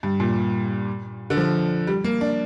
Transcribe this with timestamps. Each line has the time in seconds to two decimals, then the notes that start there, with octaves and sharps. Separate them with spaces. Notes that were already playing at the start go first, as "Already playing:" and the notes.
0.03 G2
0.20 A#2
1.30 D3
1.37 F3
1.87 G3
2.04 A#3
2.21 D4